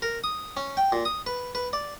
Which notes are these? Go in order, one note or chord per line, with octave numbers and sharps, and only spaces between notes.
A#4
D#6
C#4
G5
A#2
D#6
B4
B4
D5